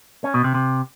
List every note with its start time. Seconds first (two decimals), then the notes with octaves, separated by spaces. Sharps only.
0.24 C#4
0.34 B2
0.44 C3
0.54 C3